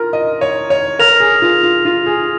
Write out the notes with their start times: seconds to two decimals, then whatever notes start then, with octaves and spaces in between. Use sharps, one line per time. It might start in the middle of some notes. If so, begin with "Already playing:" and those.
Already playing: F4 A#4
0.13 D#5
0.41 C#5
0.70 C#5
0.99 A#4 F6 A#6 F7
1.20 G#4
1.42 F4
1.63 F4
1.85 F4
2.06 G#4